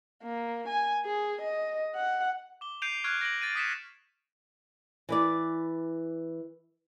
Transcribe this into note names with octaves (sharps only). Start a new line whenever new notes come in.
A#3
G#5
G#4
D#5
F#5
D6 G7
G6 C7 D7 D#7 F7
C#6 F6 F#6 G#6 D7
A#6 D7 F#7
A6 D7 D#7
D#6 A6 B6 C#7 D#7 E7
E3 B4 D5